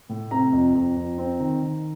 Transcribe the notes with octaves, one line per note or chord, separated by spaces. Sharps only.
A2
C3 A#5
F2
F2
F2
C4
D#3
D#3